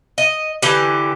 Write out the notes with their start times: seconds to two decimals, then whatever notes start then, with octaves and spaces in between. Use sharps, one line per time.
0.18 D#5
0.62 D3 E3 G4